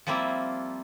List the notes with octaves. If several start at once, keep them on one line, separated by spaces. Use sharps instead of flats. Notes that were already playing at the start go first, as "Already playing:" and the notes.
F3 G3 A#3 C4 E4